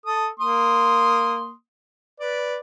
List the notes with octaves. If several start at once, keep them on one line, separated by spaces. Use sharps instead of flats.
A4 D#6
A#3 C6 D#6
B4 D5